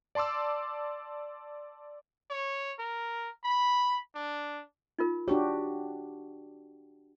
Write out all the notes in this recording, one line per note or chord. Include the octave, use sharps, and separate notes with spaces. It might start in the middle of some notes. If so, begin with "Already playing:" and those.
D5 A5 C6 D6 E6
C#5
A#4
B5
D4
D#4 F4 A#4
D4 F#4 G4 C#5